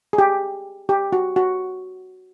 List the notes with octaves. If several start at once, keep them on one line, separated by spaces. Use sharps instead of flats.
G#4
G4
G4
F#4
F#4